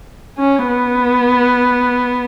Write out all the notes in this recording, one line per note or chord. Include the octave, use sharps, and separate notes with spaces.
C#4
B3